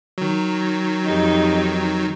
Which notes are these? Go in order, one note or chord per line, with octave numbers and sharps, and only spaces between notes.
D#3 F#3
F2 D#4 G4